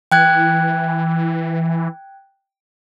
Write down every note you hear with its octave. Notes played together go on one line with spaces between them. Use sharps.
E3 G5 F#6 G#6